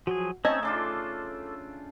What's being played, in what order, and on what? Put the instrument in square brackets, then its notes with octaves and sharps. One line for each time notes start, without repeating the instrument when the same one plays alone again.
[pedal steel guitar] F3 F#3 G#4 [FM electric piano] F#4
[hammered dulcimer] A3 D#4 [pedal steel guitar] C4 C#4 [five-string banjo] D#5 [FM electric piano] A5 E6 G#6
[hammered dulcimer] C#3 D4 F4 [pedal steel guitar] A4 C6 D6 [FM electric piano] E6